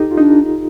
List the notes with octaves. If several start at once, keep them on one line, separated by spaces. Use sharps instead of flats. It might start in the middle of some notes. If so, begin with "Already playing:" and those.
Already playing: D#4 G4 A4
F4
D4 D#4